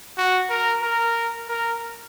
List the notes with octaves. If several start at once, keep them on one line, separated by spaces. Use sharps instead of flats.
F#4
A#4
A#4
A#4